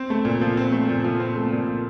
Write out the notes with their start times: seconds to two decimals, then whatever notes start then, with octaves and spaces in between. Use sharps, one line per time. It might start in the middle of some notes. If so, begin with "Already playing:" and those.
Already playing: C4
0.10 A3
0.25 A#2
0.41 F3
0.57 C4
0.72 A3
0.89 A#2
1.04 F3
1.20 C4
1.36 A3
1.52 A#2
1.68 F3